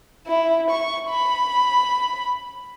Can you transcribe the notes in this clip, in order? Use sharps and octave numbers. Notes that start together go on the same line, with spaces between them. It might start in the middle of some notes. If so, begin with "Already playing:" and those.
E4
C#6
B5